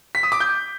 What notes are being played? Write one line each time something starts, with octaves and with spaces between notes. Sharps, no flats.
B6
D#6
D6
G6